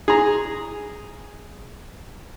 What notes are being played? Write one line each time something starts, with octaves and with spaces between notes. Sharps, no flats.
G#4 A#5